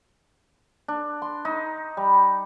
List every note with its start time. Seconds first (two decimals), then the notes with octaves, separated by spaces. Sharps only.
0.88 D4
1.22 C6
1.45 D#4
1.97 G3